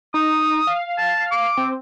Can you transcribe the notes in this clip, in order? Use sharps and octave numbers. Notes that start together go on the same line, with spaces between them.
D#4 D#6
F5
A5
D6
C4